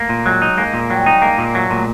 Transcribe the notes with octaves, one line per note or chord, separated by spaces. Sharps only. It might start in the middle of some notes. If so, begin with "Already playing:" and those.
Already playing: A3 A#3
A#2
F#3 G#3
D#4
G#3 A#3
A#2
F#3 G3
D#4
G#3 A#3
A#2
F#3 A3
A#2 G#3